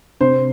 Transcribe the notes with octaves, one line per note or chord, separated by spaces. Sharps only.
C3 C5